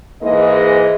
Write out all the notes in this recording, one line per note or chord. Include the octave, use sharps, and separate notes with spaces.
G#2 E3 G#3 A#3 G#4 D#5